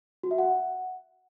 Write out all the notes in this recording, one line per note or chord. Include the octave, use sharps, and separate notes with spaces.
F#4
E5
F#5